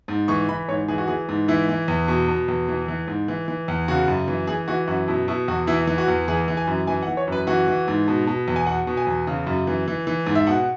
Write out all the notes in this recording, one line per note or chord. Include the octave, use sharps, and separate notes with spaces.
G#2
E3 C#6
E3 B5
G#2 C#5
E3 G#4
F#4
E3 G#4
G#2
E3 E4
E3
E2
B2
B2
E2
E3
E3
G#2
E3
E3
E2
C#3 F#4
F#2
E3
E3 G#4
E3 F#4
F#2 F#4
B2 E4
B2 E4
E2 F#4
E3 E4
E3
F#4
E2
E3 G#4
E3
G#5
F#2
E3 G#5
F#5
E3
C#5
F#2 B4
E3 F#4
E3
G#2
B2
B2
E2
G#5
B2 F#5
B2
G#5
E2
C#3
F#2
E3
E3
E3
G#2
E5
B2 F#5